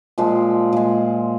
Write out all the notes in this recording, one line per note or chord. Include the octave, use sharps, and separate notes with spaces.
A#2 F3 G#3
A#2 G#3